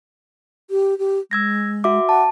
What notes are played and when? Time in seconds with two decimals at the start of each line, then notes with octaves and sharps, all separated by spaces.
0.71 G4
0.99 G4
1.31 G#3 E6 G#6 A#6
1.84 F#4 E5 D6
2.09 F#5 A5